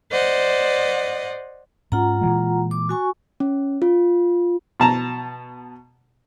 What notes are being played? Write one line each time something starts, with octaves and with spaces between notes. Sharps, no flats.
C5 D5 D#5 F#5
G#2 C#4 F4 F#5 A#5
A#2 E3 G#3
D6
F#4 G#5 C#6
C#4
F4
B2 A5 A#5